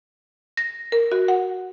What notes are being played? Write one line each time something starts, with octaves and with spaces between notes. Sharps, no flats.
A#6
A#4
F#4
F#5